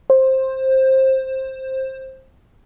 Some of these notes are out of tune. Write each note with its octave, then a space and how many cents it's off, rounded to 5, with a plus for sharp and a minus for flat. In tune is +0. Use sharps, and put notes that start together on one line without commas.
C5 +15